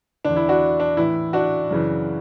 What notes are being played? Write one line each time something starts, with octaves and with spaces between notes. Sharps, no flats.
E2 D3 D4
E4
D4 F#4
D4
A2 E3 E4
D4 F#4
F#2 C#3 E3